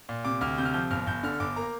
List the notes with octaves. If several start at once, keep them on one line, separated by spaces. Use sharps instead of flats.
A#2
C3 D6
D2 F6
C3 G6
F6
F3 G6
G1 F6
G1 G6
D3 F6
F6
G1 D6
A#3 A#5